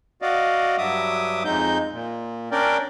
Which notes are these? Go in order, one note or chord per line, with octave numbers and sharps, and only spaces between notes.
F#4 D5 D#5 F5
G2 F#3 E5 D6 D#6
F2 G#3 D#4 G6
A#2
C#4 D4 A#4 D5 G5